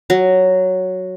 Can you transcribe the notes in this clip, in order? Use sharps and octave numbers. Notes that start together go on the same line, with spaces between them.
F#3